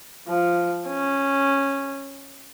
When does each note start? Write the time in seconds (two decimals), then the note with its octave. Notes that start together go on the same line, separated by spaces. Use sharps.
0.28 F3
0.88 C#4